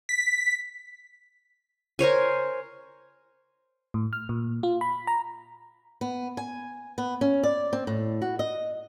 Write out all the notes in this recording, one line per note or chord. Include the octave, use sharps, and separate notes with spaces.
B6
A#4 C5 C#5 G#5
A2
F6
A#2
F4
B5
A#5
B3
G#5
B3
C#4
D5
C4
A2
F#4
D#5